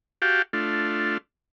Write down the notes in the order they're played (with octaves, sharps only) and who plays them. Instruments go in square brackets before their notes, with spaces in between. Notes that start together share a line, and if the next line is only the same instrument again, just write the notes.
[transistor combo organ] F#4 G4 F5 G5 A5
A3 D4 F4